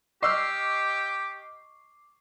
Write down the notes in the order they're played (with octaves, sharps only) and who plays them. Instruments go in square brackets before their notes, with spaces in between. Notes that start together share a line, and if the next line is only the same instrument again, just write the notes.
[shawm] G4 [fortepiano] D#5 E6 F6 [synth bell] C#6 D6 C7